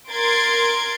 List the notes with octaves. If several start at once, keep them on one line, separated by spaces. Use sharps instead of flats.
A#4 C6 G#6 A6 C7 D7